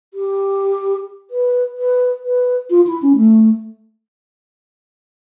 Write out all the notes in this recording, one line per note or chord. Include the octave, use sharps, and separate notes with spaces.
G4
B4
B4
B4
F4
E4
C#4
A3